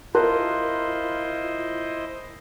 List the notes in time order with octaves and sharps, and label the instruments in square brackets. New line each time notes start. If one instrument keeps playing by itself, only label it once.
[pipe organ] E4 C5 D#5 [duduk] F4 [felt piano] A#4 [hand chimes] A5 C6 F#6